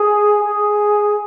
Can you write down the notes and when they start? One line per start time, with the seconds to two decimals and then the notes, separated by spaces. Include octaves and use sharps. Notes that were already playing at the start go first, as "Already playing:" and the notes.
Already playing: G#4
0.45 G#4